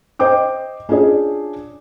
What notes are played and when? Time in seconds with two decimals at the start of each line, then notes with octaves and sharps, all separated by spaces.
0.19 C5 D#5 G5 D6 G6
0.89 C#4 D4 F4 G#4 D5